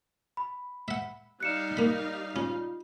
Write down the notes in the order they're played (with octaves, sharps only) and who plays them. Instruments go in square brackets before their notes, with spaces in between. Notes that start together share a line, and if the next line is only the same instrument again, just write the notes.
[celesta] B5
[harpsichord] E5 F#5
[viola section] G3 D#4 F5 [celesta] F#6 C#7 E7
[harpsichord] A#3 B5
[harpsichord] C#4 [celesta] F4